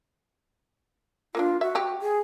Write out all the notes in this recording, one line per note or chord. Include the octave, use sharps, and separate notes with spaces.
A#3 B3 D4 F4
F#4 E5
F#3 G4
G#4